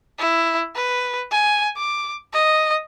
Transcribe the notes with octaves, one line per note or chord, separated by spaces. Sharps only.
E4
B4
G#5
D6
D#5